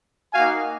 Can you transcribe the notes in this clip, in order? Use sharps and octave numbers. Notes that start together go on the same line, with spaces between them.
A#3 D#4 F#4 F5 G#5